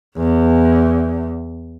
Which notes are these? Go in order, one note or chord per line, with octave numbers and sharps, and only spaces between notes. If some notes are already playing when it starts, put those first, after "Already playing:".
E2